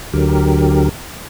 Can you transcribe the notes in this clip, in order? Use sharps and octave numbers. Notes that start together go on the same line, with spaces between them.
D2 D3 F#3 G4 A#4